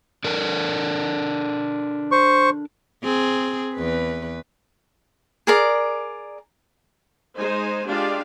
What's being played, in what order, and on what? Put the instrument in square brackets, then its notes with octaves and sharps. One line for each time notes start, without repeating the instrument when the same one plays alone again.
[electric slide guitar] D4 A4 A#4
[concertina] C5 C#6
[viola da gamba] C4 G#4
E2 B4
[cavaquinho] G#4 A#4 D5
[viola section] G#3 D#4 C5 G#5
G#3 D4 F4 G4 D5 F5